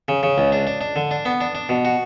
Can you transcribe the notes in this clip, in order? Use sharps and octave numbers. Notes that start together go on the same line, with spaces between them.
C#3
C#3
C#2
D4
D4
D4
D3
D4
B3
D4
D4
B2
F#4